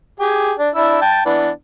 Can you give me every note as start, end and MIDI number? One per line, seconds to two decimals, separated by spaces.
0.20 0.52 67
0.20 0.52 68
0.58 0.69 62
0.75 1.00 62
0.75 1.00 64
0.75 1.00 88
1.02 1.22 79
1.02 1.22 81
1.26 1.50 52
1.26 1.50 59
1.26 1.50 62